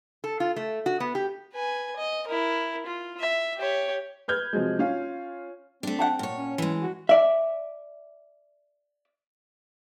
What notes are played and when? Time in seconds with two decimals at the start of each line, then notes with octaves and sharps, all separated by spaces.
0.24 A4
0.40 F4
0.56 A3
0.86 F#4
1.00 B3
1.15 G4
1.53 B4 G#5
1.97 D#5
2.27 E4 A#4
2.86 F4
3.20 E5
3.57 G4 C#5
4.28 B4 F6 G6 G#6
4.53 C3 F3 F#3 G#3
4.79 C#4 F4 F5
5.83 A3 C4 D4
5.99 F#5 G5 A5
6.19 A#2 C#5
6.38 C#4
6.58 E3 G#3
6.82 F#4
7.09 D5 E5